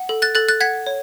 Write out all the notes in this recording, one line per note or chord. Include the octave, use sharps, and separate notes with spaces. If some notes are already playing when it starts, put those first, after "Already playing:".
Already playing: F#5
A4
F#6 A6
A4 F#6 A6
F#6 A6
F#5 G#6 B6
C#5